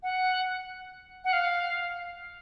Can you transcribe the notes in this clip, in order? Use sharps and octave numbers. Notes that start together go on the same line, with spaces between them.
F#5
F#5
F5